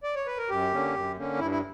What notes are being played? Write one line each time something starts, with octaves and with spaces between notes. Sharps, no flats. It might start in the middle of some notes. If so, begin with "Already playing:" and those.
D5
C#5
B4
A#4
F#2 G4
D3 A#3 C#4
F#2
D3 A#3 C#4
G2 E4
E4